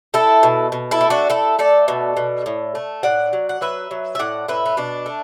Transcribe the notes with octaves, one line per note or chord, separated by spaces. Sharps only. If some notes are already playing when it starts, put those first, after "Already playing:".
A3 E4 A4
B2
B2
E4 A4
A3
D4 F#4
A3 E4 A4
A3 A4 D5
B2
B2
A2
A3
A2 D5 F#5
F#3
F#5
F#3 B4 E5
F#3
E5
A2 D5 F#5
A2 B4 E5
B3
B2 D4
A3